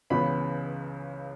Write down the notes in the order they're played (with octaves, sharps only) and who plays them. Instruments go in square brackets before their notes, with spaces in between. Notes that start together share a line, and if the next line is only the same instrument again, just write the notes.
[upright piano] C#2 C#3 E3 B3 B5